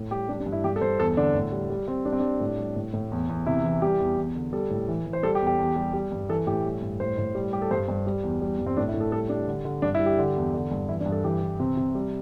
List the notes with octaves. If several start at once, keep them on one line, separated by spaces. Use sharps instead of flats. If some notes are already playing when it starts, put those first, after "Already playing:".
Already playing: A2
G3 G4
G3 D4
D4
G2
E4
G2 G4
A4
G2 C5
E2 A4
D3 D4
A2
G3
G3
G3 C4
G3 D4
C4
G3 D4
A2
G3
A2
A2
E2
E2
C3 E4
E3
G3 G4
E2
E2
D3
G3 A4
A2
E3
E3
C5
G3 A4
G4
E2
G4
E2
G3
G3
G2
E3 A4
A2 G4
G3
G2
A2 C5
A2
G3
G3 G4
A4
G2 C5
G2
G3
E2
G3
G2
C4
A2 D4
E4
A2
A4
G3 A4
G3 D4
D3
D3
G2 D4
E4
G3
G4
D3
E2
D3
G2
E3 E4
D4
G2
A4
E3 G4
E3
C3 C4
C3
G3